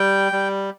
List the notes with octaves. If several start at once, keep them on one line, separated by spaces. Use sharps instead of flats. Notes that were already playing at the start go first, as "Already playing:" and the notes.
Already playing: G3 G5
G3